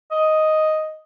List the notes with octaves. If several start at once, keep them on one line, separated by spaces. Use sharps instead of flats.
D#5